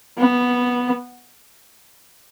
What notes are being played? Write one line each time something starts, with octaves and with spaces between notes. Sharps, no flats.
B3